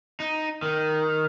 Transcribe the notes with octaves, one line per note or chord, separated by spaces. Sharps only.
D#4
D#3